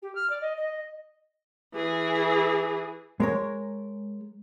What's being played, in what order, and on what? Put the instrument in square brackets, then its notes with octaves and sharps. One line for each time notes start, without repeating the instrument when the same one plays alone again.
[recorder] G4
F6
D5
D#5
D#5
[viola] E3 G#4
[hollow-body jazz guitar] G#3 A#4 C#5